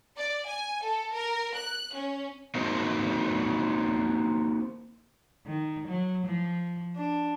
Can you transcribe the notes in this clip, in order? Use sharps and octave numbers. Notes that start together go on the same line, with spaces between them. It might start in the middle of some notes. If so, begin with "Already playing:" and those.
D5
G#5
A4
A#4
F#6
C#4
A#3 C4 D#4 F#4 A#4 C5
D#3
F#3
F3
D4